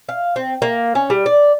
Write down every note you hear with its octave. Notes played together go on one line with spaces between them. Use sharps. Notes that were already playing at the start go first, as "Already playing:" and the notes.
F5
C4
A#3
C#4
G3
D5